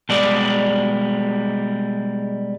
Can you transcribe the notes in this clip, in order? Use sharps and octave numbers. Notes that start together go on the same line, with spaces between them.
B2 G3 G#3 D5